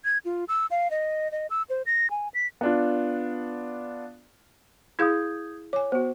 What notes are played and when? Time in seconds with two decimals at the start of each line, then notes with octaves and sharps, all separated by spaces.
0.05 G#6
0.25 F4
0.48 E6
0.71 F5
0.91 D#5
1.32 D#5
1.50 E6
1.70 C5
1.86 A#6
2.11 G#5
2.34 B6
2.61 B3 D4 F4
4.99 E4 G#4 F5 D#6 G6 G#6
5.73 C#5 G#5 D6
5.92 B3 F#4 C5